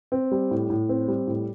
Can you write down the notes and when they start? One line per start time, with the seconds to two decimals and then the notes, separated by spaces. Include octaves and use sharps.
0.12 C4
0.32 G3
0.51 A2
0.70 A2
0.89 C4
1.08 G3
1.27 A2